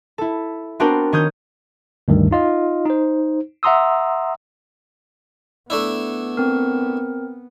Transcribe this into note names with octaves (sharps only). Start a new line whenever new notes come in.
E4 A4
B3 C4 D4 F#4 A#4 C5
D#3 C#5 D#6 F6 G6
D2 G2 D#3 G3
D#4 F4 D#5
D#4 C5
E5 F#5 A#5 C6 D#6 E6
A3 B3 D4 E4
C4 A#4